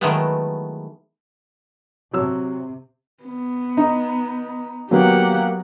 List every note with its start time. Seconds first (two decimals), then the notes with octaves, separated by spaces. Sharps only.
0.01 D#3 E3 F#3 G#3 A3 B3
2.13 C3 F#3 E6
3.24 B3
3.77 D#4
4.91 F#3 A#3 B3 G4 F#5